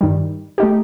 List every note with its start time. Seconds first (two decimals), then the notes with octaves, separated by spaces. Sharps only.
0.01 G2 D#3 G3
0.58 A3 D#4 G4